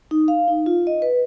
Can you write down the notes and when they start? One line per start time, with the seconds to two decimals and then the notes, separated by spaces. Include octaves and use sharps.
0.11 D#4
0.28 F5
0.48 D#4
0.66 F4
0.87 D#5
1.02 B4